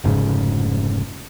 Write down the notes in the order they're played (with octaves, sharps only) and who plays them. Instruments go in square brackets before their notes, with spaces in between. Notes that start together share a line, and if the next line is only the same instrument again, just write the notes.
[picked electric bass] F1 G#2 C#3